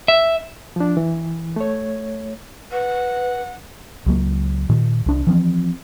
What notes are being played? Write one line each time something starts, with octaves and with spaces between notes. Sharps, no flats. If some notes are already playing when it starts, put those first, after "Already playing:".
E5
F3 D4
E3
A3 C#5
B4 F#5
C#2 F#3 A#3
A#2 D#3
C2 D4
E3 F3 C4